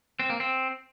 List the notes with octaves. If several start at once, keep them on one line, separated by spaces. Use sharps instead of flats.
C4
A#3
C4